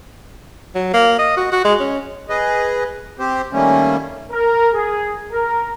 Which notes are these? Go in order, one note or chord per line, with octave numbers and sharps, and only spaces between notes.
F#3
A#3
D#5
F#4
F#4
G#3
C#4
G#4 B4 D#5
C4 G4 C5
D#3 G3 A3 A#3 C#4
A#4
G#4
A#4